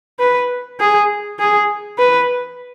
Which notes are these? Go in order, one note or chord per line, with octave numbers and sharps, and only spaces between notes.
B4
G#4
G#4
B4